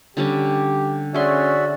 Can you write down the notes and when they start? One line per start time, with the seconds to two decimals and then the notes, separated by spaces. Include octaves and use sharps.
0.17 D3 G3 C#4 G4
1.14 C#4 F#4 G#4 D5 E5 C6